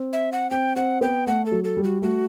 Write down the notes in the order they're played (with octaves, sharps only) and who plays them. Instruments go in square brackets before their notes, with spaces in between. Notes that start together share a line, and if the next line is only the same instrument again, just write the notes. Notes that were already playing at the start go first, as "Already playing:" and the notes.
Already playing: [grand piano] C4
[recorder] E5
F#5
[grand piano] C4 [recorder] G5
[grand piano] C4 [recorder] F#5
[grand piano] B3 [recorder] G5
[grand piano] A3 [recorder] F#5
[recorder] A4
[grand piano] F#3
[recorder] A4
[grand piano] G3
[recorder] F#4
[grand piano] A3 [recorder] F#4